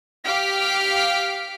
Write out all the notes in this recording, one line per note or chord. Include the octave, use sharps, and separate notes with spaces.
G4 F5 F6 B6 D7